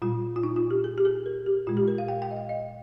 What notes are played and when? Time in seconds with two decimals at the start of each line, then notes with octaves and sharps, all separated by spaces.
0.02 A#2 G3 F4
0.36 F4
0.43 D#4
0.56 F4
0.71 G4
0.84 G#4
0.98 G4
1.05 G#4
1.26 A#4
1.46 G4
1.67 A#2 G#3 F4
1.77 G4
1.88 A#4
1.98 F5
2.08 G5
2.22 G5
2.31 D#5
2.36 F5
2.49 D#5